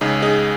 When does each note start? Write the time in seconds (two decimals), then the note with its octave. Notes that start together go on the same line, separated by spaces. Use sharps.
0.01 C#2 C#3 D#4 G#4
0.22 D#4 G#4